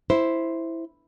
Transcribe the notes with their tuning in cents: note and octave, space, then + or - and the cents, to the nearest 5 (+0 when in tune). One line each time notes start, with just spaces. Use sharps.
E4 +0 C5 +0